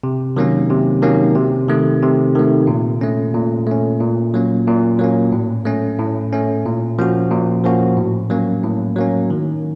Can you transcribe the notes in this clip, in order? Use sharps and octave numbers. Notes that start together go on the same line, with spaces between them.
C3
D#3 F#3 A#3 C#4
C3
D#3 F#3 A#3 C#4
C3
D#3 A3
C3
D#3 A3
A#2
A3 C#4
A#2
A3 C#4
A#2
F#3 A#3 C#4
A#2
F#3 A#3 C#4
A2
A3 C#4
A2
A3 C#4
A#2
F3 A#3 C#4 F#4
A#2
F3 A#3 C#4 F#4
A2
F#3 A#3 C#4
A2
F#3 A#3 C#4
D#3